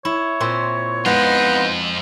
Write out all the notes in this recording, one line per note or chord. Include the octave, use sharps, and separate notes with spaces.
E4 C#5
A#2 C4 E5
F2 G#3 B3 D#4 F4